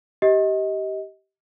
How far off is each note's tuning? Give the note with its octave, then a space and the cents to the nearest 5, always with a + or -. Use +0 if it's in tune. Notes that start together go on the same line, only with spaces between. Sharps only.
G4 -15 D#5 +25